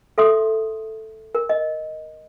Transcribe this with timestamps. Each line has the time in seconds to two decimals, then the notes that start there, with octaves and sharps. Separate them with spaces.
0.18 A4 E5 C6 D#6
1.35 A#4
1.49 D#5